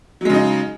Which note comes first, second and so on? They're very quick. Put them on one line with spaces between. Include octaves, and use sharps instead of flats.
F#3 G#3 C#3 D#4